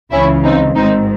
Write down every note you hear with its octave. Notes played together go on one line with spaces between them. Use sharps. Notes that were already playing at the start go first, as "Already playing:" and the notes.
C#2 C#3 E3 C#4 E4
C4 D#4
G#1 G#2 D#3 C4 D#4